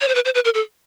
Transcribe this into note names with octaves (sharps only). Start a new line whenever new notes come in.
C#5
C5
B4
C5
B4
A#4
A4